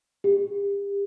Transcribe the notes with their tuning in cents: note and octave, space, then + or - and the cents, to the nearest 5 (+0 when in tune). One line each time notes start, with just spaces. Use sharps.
G4 +40